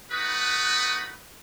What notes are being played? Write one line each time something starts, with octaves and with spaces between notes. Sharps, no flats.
A3 D#4 F#4 B4 B5 D#6